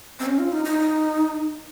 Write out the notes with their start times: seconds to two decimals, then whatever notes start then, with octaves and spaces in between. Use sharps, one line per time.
0.20 C4
0.26 C#4
0.39 F4
0.52 D#4
0.65 D#4